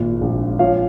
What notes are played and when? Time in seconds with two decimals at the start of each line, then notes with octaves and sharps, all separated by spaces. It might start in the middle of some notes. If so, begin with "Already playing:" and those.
Already playing: G#1 A#2
0.21 A#1
0.59 F3 C#5 F5